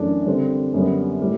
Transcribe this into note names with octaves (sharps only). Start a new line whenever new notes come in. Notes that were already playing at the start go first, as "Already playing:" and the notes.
Already playing: F#2 E3 A3 D4 A4
D3 G3 C4
F#2 D3 G3 B3
A2 G3